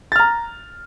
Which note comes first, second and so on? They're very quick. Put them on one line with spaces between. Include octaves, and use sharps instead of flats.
A6 F6 A#5